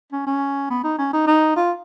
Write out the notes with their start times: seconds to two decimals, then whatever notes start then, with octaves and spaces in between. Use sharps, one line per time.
0.12 C#4
0.26 C#4
0.70 B3
0.84 D#4
0.98 C#4
1.13 D#4
1.27 D#4
1.56 F4